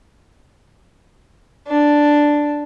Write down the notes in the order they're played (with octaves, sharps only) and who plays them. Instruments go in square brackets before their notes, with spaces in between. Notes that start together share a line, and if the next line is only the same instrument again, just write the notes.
[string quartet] D4